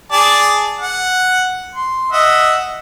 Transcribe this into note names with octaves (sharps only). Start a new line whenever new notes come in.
G#4 D5 A5
F#5
C6
D#5 E5 F#5